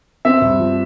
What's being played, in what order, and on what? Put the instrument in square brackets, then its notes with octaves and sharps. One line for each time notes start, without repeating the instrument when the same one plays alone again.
[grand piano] C4 [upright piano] E5
[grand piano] G2
F3